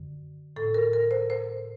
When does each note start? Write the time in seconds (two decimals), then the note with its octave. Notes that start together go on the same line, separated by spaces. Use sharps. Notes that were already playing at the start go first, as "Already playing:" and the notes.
Already playing: F#2 D3
0.56 A2 A4
0.74 A#4
0.93 A#4
1.11 C5
1.30 C5